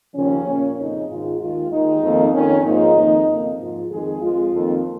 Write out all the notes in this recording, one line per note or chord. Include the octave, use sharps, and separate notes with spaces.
D#2 C#3 F3 C#4
A#2 A#3
F2 C#3 F3 D#4
G#2 D#3 G#3 F4
D#2 D#3 G#3 F4
D#2 D#3 G#3 D#4
F2 D#3 A#3
F2 D#3 A#3 C#4
G#2 F3 A#3 D#4
F2 D#3 A#3
F2 C#3 A#3
G#2 F3 G#3 F4
F2 D#3 G#3 G#4
F2 F3 G#3 F4
F2 D#3 A#3